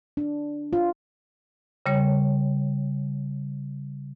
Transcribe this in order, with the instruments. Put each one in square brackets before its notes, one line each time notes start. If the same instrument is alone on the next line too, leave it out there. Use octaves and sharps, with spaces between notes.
[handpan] D4
F4
[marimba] C#3 G3 C#5